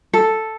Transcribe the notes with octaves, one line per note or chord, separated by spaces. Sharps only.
A4